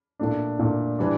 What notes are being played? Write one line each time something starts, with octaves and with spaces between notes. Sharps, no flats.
A#2 A3 D4
A#2 A3 D4
E3 G3 D4